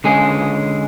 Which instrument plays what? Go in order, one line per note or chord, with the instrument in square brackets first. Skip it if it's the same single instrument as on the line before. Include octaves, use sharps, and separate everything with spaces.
[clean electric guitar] D3 G#3 C#4 G#4